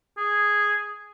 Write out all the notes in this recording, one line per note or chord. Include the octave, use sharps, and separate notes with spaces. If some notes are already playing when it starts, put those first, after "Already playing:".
G#4